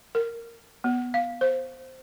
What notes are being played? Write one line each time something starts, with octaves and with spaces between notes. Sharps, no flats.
A#4
B3
F5
C5